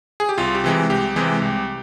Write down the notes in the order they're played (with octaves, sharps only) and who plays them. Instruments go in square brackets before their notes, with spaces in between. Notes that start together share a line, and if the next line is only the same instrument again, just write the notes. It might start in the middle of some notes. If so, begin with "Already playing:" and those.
[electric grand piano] G#4
G4
C2 F4
G4
C3 E3 G#3
C2 G4
C3 E3 G#3
C2